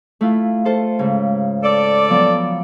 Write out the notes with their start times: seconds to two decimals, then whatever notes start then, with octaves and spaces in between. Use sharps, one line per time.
0.21 A3 E4 F4
0.65 F4 A4 C5
0.99 G#2 C#3
1.63 A4 D5
2.09 F3 F#3 B3